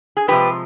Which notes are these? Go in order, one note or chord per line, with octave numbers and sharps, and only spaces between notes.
G#4
C3 F3 G#3 G4 B4